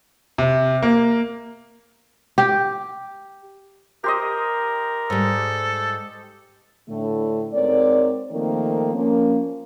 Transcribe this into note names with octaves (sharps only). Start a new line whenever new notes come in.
C3
A#3
G4
G4 A#4 C5 D#5
G#2 G3 A4
A2 D3 A3
G#2 C4 A#4 C#5 D5
D#3 F3 A3 A#3 C4
F3 A#3 C#4